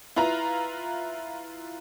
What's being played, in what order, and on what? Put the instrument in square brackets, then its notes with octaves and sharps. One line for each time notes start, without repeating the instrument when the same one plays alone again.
[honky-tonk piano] E4 F4 B4 A#5